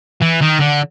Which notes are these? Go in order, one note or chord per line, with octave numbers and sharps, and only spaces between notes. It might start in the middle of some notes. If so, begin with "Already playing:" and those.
E3
D#3
D3